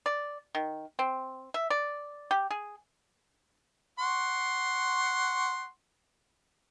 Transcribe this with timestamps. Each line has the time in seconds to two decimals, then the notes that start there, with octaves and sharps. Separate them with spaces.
0.06 D5
0.55 D#3
0.99 C4
1.54 E5
1.70 D5
2.31 G4
2.50 G#4
3.99 F#5 C6 C#6